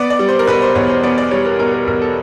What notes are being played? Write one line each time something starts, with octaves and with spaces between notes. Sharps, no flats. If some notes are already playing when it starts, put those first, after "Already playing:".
Already playing: B3 D5
D5
G3
C5
A#4
B2 B4
C5
E2 C#5
C5
B3 D5
D5
G3 C#5
A#4
B2 A#4
A#4
E2 A#4
A4